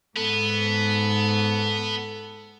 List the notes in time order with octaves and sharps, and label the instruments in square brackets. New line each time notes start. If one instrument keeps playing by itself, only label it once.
[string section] G#2 [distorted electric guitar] B3 [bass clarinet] A4